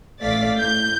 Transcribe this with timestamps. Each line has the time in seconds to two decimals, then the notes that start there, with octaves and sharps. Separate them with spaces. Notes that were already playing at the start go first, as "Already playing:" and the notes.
0.22 A1 A3 D5 F5 A6 B6
0.57 A2 G6